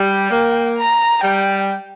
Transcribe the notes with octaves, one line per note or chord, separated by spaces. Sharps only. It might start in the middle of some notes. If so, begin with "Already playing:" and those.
Already playing: G3 G5
A#3
A#5
G3 G5